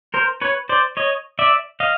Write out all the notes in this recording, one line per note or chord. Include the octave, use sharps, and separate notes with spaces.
A#4 C5
B4 C#5
C5 D5
C#5 D#5
D5 E5
D#5 F5